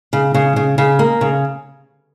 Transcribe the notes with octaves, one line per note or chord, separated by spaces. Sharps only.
C#3
C#3
C#3
C#3
A#3
C#3